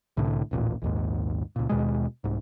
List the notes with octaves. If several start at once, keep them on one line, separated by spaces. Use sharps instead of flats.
C2 A2 D3
D#1 A1 A#2
A#1 D#2 G#2
C#2 A#2
D#2 B2 G#3
C2 G#2